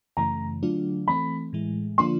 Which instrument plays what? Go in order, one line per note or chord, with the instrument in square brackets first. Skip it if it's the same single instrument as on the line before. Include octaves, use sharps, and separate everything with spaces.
[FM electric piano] F#2 C#3 E3 A3 [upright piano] A#5
[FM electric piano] D3 F#3 A3 D4 F4
[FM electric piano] E3 A3 C4 [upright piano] B5
[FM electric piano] A2 E3 G#3
[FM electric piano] D3 F3 A#3 D4 F4 [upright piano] C6